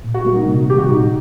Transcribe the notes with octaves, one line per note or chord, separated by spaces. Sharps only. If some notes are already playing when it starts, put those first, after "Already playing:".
A#2
F#4
G3 A#3 F#4
D#4
C3
D#3 G3 G4
F#4
A#2 D#4